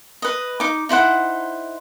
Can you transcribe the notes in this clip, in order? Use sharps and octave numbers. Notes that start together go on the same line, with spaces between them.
B4 D#5
D#4 D6
D#4 E4 C5 F#5